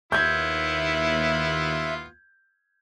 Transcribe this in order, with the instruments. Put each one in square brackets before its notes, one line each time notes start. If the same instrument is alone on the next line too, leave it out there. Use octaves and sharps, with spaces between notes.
[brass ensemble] D#2 [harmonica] B3 E4 F4 [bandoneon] E5 [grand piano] G6 G#6